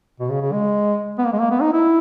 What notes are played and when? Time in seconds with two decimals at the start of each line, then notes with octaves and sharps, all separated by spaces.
0.20 B2
0.30 C#3
0.42 C#3
0.52 G#3
1.18 B3
1.25 A#3
1.33 G#3
1.39 A#3
1.51 B3
1.62 D#4
1.73 E4